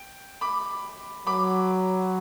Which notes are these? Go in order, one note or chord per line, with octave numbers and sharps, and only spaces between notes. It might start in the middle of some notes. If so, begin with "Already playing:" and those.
Already playing: G5
B5 D6
F#3 B5 D6